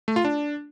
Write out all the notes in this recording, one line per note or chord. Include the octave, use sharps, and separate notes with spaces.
A3
F4
D4